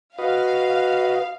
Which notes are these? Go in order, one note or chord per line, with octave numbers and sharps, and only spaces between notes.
F#4 B4 D#5 F5